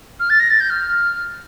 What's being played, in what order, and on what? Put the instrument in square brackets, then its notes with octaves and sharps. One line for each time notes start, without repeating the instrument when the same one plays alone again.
[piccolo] F6
A6
A#6
A6
G6
F6